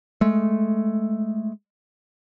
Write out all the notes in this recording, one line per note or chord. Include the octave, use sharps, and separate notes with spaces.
G#3 A3